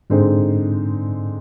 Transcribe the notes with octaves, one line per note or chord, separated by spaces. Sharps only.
G#2 D3 G#3 C4 D#4